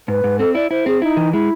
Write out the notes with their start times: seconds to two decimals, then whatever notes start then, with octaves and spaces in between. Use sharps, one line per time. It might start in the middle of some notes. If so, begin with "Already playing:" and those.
0.08 G#2 B4
0.24 G#2
0.39 C4 A4
0.55 E4 D5
0.71 E4 C5
0.86 C4 G#4
1.02 D#4 E4
1.17 E3
1.32 G#3 E4